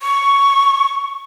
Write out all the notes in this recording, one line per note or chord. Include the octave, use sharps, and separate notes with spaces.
C#6